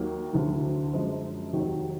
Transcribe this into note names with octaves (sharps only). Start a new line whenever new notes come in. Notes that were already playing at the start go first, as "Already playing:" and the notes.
Already playing: D#2 D#3 F#3 A#3
D2 D3 F#3
F#2 F3 G#3
F1 D#2 D#3 F#3